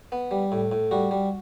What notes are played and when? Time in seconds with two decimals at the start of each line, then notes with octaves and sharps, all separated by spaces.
0.12 B3
0.31 G3
0.52 A2
0.72 A2
0.91 G3 F#4
1.11 G3